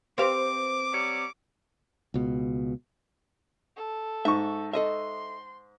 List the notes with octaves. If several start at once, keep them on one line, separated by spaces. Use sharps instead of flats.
C4 G4 B4 C5 F5 D6
F#3 G3 C#5
C#2 B2
A4
G#2 E5 C#6
A4 D#5 E5 C6